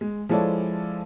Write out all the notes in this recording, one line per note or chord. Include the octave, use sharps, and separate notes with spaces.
G#3
F3 G#3 E4 A4 C#5 D5